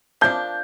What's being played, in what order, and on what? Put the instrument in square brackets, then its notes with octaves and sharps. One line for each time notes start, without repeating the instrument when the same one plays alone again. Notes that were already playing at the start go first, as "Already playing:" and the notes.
[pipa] F3 A#3 D4 [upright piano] G6